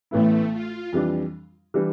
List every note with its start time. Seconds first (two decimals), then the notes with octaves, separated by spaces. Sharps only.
0.11 A1 A2 E3 A3 B3 E4
0.52 F4
0.93 F2 E3 G3 D4
1.74 E3 G3 D4